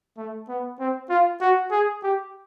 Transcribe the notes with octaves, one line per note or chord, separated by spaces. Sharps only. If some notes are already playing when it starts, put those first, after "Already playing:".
A3
B3
C4
F4
F#4
G#4
G4